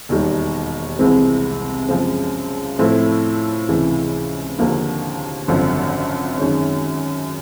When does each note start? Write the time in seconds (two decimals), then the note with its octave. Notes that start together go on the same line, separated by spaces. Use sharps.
0.09 E1 D#2 D#3 G3
0.99 C2 C3 E3 G#3 C4
1.89 F#2 C#3 F3 G#3 C4
2.79 A2 F3 A3 C4 E4
3.68 C#2 C3 E3
4.59 D#2 D3 F3 A#3
5.48 G#1 F#2 D3 F3
6.38 F#2 D#3 G#3 C#4